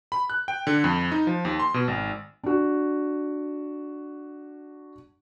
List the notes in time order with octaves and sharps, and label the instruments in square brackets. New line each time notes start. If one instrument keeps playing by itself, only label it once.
[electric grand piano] B5
F#6
G5
D3
F2
D#4
F3
D#2
C6
B2
G#1
[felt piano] D4 F#4